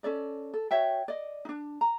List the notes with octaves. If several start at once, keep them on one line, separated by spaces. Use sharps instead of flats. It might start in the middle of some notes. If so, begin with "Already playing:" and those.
C#4 A4 D5 D#5
A4
F#4 C#5 E5 G5
D5 D#5
D4 D#4
A#5